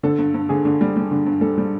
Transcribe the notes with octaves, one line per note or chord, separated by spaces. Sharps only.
D3 A4
G2
G2
D3 G#4
D3
G3
G3
D3
G2
G3 A4
G3